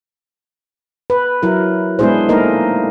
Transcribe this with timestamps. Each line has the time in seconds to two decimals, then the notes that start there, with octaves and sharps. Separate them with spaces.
1.10 B4
1.42 F#3 E4 A#4
1.99 G#3 B3 D4 E4 G#4 C5
2.29 A3 A#3 D#4 A#4 D#5